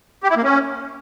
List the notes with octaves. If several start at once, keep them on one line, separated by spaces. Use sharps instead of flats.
G4
E4
A#3
C#4